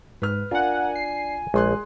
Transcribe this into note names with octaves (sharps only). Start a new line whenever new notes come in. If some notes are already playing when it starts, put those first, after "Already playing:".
G#2 B4 F6
D4 F4 A#4 F#5 G#5
C7
A#1 G#3 G#4 C6 F#6